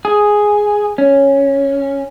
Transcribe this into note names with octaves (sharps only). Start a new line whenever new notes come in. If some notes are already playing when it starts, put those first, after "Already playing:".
G#4
C#4